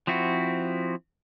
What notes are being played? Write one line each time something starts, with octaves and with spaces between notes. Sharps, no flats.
F3 C4 E4 F#4